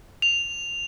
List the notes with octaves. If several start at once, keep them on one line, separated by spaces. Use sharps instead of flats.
F7